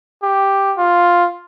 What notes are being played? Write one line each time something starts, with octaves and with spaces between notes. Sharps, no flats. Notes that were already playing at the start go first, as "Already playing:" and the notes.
G4
F4